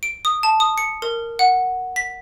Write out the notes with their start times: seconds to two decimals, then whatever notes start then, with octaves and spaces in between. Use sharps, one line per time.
0.03 D7
0.25 D#6
0.43 A5
0.60 D#6
0.78 C#7
1.02 A#4
1.39 F#5
1.96 B6